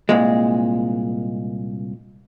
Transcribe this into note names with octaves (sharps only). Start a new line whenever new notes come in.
C2 A#2 G#3